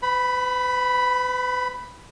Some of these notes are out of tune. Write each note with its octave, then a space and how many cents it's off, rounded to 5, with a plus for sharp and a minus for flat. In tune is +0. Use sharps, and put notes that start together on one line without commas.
B4 +40 B5 +0